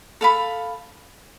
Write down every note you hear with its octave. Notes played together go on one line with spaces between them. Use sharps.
A4 F5 B5